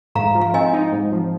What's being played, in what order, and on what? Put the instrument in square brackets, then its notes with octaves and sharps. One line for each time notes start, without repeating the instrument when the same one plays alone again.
[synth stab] G#2 [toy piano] F5 A#5
[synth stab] F3
[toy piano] F5
[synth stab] C4 [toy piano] D#5 G#5
[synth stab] D#4
G#2
F3